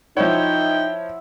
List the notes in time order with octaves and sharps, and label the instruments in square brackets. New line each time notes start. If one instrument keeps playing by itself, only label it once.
[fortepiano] F3 C5 C#5 [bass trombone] D#4 [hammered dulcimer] E4 E5 F#5 [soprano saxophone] G5